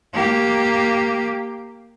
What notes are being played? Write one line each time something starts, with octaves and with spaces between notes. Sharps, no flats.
A#3 G4